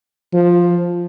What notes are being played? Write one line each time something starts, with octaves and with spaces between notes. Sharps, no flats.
F3